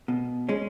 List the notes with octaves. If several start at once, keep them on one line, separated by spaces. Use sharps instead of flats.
B2
G#3 C#4